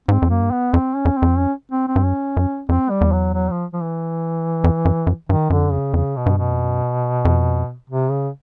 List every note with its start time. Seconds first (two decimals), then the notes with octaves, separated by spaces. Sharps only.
0.08 G#2 C4
0.22 F2
0.30 F#2 A#3
0.41 G2
0.51 B3
0.73 F2 C4
0.95 C#4
1.05 F2
1.17 C4
1.22 F2
1.38 C#4
1.72 C4
1.88 C4
1.96 G2
2.04 F#2 C#4
2.37 F#2
2.69 F2 C4
2.90 G3
3.01 E2
3.12 F#3
3.34 F#3
3.51 F3
3.73 F3
3.82 E3
4.64 F2
4.85 F#2
5.07 F#2
5.29 G2 D#3
5.50 F#2 D3
5.58 F2
5.65 F#2
5.72 F2 C#3
5.94 F2 C#3
6.16 B2
6.26 G2
6.37 F#2 B2
6.51 F2
6.64 F#2
7.25 F2
7.90 C3
8.11 C#3